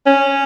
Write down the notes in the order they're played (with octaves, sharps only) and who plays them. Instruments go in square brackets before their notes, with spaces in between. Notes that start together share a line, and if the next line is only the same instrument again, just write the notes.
[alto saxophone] C#4